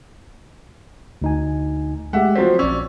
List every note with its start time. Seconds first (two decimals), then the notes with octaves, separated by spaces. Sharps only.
1.22 D2 D#4 G#5
2.13 G#3 A3 G4 E5 F#5
2.35 F3 F#3 C4 B6
2.59 A#1 C#4 D5 E6